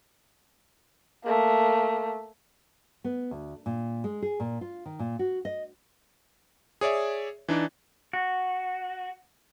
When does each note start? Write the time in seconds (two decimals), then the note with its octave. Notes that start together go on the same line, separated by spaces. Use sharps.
1.24 A3 A#3
3.04 B3
3.31 D2
3.66 A#2
4.04 G#3
4.22 G#4
4.40 A#2
4.61 F4
4.86 D#3
4.99 A#2
5.19 F#4
5.45 D#5
6.81 G#4 C#5 D5 E5
7.48 E3 D4 D#4 D5
8.13 F#4